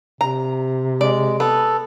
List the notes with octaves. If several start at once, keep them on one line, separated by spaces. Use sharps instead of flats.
C3 A#5
G#3 D5
B3 A4